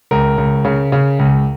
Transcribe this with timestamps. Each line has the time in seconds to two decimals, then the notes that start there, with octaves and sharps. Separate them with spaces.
0.11 C#2 A#4
0.38 C#2
0.65 C#3
0.92 C#3
1.19 C#2